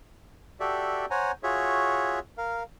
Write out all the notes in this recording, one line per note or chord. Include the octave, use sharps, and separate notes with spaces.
F#4 G4 A4 D5 E5
C5 C#5 F#5 G#5 A#5
F4 F#4 G#4 C#5 E5
A#4 F5